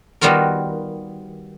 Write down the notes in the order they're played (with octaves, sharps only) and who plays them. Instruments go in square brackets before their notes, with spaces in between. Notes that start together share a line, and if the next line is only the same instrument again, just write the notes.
[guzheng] D#3 G3 B3 F4 F#4 A#4